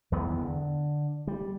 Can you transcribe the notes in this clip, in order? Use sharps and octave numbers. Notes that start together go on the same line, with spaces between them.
E2 D#3 B3
D3
G3